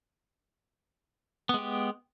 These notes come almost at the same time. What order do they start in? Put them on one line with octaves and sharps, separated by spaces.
B3 G#3 G4